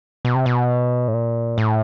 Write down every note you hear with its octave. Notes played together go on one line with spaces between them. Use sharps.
B2
C3
B2
A2
A#2
A2